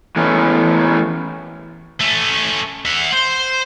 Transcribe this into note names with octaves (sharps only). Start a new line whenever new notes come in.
E3 A3 B3 C#4
A3 C#4
E5 F#5
C5